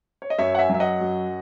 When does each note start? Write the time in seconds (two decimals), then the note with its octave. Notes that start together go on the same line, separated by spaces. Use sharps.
0.22 C#5
0.30 D#5
0.38 F#2 C#5 E5
0.55 F#5
0.59 E5 G#5
0.69 F#3 E5
0.80 D#5 F#5
1.01 F#2